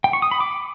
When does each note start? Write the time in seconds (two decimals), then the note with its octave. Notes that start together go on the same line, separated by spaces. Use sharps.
0.04 G5
0.13 C#6
0.22 D#6
0.31 B5
0.41 D6